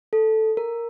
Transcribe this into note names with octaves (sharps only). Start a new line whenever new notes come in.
A4
A#4